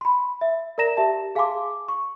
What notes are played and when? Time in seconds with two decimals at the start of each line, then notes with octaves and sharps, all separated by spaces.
0.01 B5 C6
0.41 E5
0.78 A#4 D5 A#5 A#6 E7
0.97 G4 E5 A5
1.35 G#4 F5 G#5 A5 C6 D6
1.88 C#6